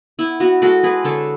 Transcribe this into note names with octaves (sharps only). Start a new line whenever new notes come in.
B3 E4
B3 F#4
G#3 F#4 A4
G#3 G#4 B4
D3 A4 C#5